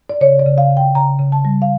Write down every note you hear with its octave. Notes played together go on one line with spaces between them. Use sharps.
D5
C#3 C#5
D5
C#3
F5
C#3
G5
C#3 A#5
C#3
A5
G3
F5